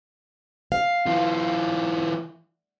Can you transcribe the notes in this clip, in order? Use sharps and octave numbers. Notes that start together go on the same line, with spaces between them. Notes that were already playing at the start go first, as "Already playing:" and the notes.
F5
E3 F4